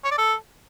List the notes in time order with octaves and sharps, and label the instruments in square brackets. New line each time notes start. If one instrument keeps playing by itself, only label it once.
[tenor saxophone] C#5
D5
A4